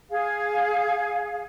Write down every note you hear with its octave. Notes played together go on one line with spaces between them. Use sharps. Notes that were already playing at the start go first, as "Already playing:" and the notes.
G#4 F5